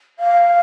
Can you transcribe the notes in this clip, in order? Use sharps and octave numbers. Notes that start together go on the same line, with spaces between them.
F5